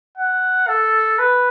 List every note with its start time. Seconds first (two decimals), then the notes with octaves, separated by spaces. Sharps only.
0.18 F#5
0.68 A4
1.19 B4